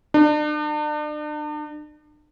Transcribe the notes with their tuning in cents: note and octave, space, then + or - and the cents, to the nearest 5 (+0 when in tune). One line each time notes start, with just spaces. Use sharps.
D4 +40